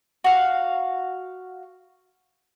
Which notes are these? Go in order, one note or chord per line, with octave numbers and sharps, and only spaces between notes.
F#4 F5